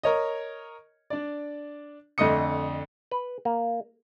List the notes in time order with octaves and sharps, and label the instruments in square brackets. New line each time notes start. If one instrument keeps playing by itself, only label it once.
[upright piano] A#4 C#5 D#5
D4 D5
F2 D3 A3 D#5 D#6 C#7
[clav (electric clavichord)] B4
A#3